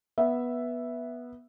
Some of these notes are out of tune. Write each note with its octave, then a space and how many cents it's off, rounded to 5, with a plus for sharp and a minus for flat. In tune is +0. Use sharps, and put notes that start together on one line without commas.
B3 -10 E5 +0